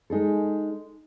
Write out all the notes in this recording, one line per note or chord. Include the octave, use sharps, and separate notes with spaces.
G#3 D#4 G#4 A4